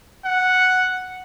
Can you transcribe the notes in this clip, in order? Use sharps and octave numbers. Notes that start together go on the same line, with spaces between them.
F#5